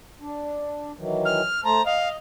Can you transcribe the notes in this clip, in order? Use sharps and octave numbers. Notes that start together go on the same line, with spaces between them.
D4
D#3 E3 F#3
F6
A3 C5 A5 A#5
D#5 F5